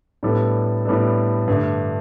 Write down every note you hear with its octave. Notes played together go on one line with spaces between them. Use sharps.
A2 G3 B3 D4 A4
A2 G3 B3 D4 A4
G2 D3 A3